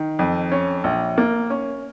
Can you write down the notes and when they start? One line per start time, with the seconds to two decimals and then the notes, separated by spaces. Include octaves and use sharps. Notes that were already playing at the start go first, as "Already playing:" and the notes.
Already playing: D#3
0.19 F2
0.52 C#4
0.84 A#1
1.18 A#3
1.50 C#4